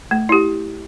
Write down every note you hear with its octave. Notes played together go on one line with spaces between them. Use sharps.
A3
E4 G4